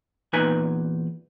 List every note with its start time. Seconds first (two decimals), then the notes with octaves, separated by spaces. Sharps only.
0.33 E2 A#2 D#4 B4 G#5 A#5